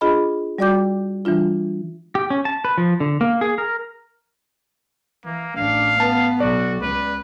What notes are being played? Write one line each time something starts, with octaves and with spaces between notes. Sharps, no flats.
D4 F4 G#4 D#5 B5
G3 F#4 D5 G5 D6 G6
E3 G3 D4 F4
G4
C#4
A5
B4
F3
D3
A#3
G#4
A#4
E3 A#3
A1 D4 F5
B3 A5
B1 F#4 D5
C#2 B4